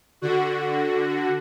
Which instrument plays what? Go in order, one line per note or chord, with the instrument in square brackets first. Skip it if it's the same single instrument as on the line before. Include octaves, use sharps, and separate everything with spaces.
[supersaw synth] D3 F#4